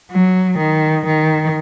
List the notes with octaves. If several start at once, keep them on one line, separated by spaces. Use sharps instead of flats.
F#3
D#3
D#3